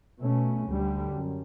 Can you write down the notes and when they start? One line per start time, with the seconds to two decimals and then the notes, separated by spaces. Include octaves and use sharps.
0.21 B2 A3 C#4
0.67 D2 D3 G3
1.13 F#2